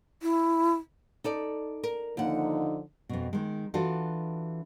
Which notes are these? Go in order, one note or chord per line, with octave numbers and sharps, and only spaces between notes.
E4
D#4 A4 D5
A#4
D#2 D3 F3 D#4 F#5
F2 B2
D#3 G#3
E3 D4 F4 F#4 A4